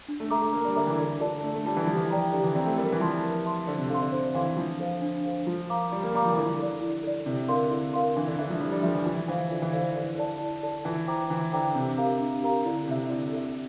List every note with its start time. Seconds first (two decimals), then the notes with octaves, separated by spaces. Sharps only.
0.08 D4
0.20 A3
0.30 A3 A4 E5 A#5 D6
0.42 A3
0.53 A#3 D4
0.65 G3
0.75 D3 A4 E5 A#5 D6
0.87 E3
0.98 D3 D4
1.20 F4 A4 D5 A5
1.43 A3 D4
1.54 A3
1.65 G3 F4 A4 D5 A5
1.77 E3
1.87 F3 G4
1.97 E3
2.11 D5 G5 A#5
2.32 D3 G4
2.44 E3
2.55 C4 D5 G5 A#5
2.66 A3
2.77 G3 A#4
2.92 E3
3.00 F3 E5 A5 C6
3.23 A#4
3.45 E5 A5 C6
3.67 D3 C5
3.78 C3
3.90 D3 F5 C6
4.01 D3
4.12 D3 C5
4.34 E3 F5 C6
4.57 F3 D4
4.80 A4 C5 F5
5.02 D4
5.24 A4 C5 F5
5.47 F3 F4
5.69 A#4 F5 A#5 D6
5.91 G3 F4
6.03 A#3
6.14 G3 A#4 F5 A#5 D6
6.26 F3
6.31 E3
6.36 D3 E4
6.59 A4 D5
6.81 E4
7.03 A4 D5
7.26 C3 E4
7.48 D3 A#4 F5 C6
7.71 D3 E4
7.93 A#4 F5 C6
8.16 E3 D4
8.27 D3
8.39 E3 A4 E5
8.50 F3
8.60 G3 D4
8.72 G3
8.83 F3 A4 E5
8.95 E3
9.05 E3 F4
9.28 E3 C5 F5
9.51 D3 F4
9.62 E3
9.73 D3 C5 F5
9.96 D3 E4
10.18 A4 D5 A5
10.40 E4
10.63 A4 D5 A5
10.85 E3 F4
11.08 C5 G5 A#5 D6
11.30 E3 F4
11.53 D3 C5 G5 A#5 D6
11.75 C3 D4
11.98 G4 A#4 F5 A#5
12.19 D4
12.42 G4 A#4 F5 A#5
12.65 D3 E4
12.87 C3 A4 E5
13.09 D3 E4
13.33 A4 E5